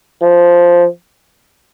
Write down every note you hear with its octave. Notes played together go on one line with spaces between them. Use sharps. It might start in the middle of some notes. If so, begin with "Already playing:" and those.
F3